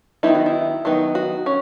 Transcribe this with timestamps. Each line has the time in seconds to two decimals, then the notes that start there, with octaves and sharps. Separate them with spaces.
0.23 D#3 F#3 B3 D#4 E4
0.35 F#4
0.46 E4
0.85 D#3 F#3 B3 D#4
1.15 F#4
1.46 C#4